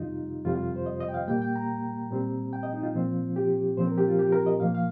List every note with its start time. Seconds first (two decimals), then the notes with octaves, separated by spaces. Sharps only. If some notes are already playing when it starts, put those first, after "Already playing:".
Already playing: F2 C3 G3 D#4 F4
0.45 F2 C3 G3 F4
0.55 F4
0.76 C5
0.86 D#5
1.00 D#5
1.09 G5
1.14 F5
1.27 A#2 G3 A#3 G5
1.42 G5
1.56 A#5
2.11 A#2 G3 C4
2.53 G5
2.63 D#5
2.73 D#4
2.83 F4
2.94 A#2 F3 C4
3.36 G4
3.77 A#2 F3 C4 C5
3.87 A#4
3.98 G4
4.08 F4
4.19 G4
4.32 A#4
4.46 D#5
4.60 A#2 F3 A#3 F5
4.74 F5